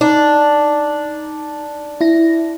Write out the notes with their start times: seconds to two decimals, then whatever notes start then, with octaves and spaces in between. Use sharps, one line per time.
0.01 D4 D#4
2.01 E4 A#6